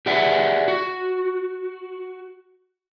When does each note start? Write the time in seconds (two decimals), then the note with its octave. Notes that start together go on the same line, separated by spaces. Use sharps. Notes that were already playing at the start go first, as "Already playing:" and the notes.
0.06 G4 G#4 D5 E5 F#5
0.68 F#4